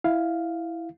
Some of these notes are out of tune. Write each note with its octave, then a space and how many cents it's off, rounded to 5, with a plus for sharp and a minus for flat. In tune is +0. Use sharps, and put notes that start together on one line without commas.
E4 +0 F5 +0